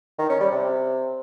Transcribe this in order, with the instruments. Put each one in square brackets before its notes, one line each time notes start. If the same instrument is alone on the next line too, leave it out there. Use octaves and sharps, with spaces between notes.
[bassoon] D#3
C#4
G3
C3